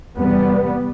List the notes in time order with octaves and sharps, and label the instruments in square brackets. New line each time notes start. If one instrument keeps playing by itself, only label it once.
[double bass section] E2 C3 G3 B3